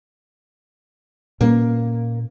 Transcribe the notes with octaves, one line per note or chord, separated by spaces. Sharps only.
A#2 A#3 C#4